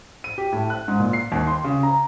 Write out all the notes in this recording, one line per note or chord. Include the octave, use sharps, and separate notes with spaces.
D#7
G4
A2
F#6
G#2
A#2
C7
D#2
C6
C#3
A#5